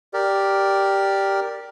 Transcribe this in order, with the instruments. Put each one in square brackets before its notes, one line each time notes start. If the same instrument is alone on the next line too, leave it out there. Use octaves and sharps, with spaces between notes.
[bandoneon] G4 A#4 D5